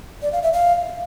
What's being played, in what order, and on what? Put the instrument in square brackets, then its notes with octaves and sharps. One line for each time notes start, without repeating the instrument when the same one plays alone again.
[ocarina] D5
F5
E5
F5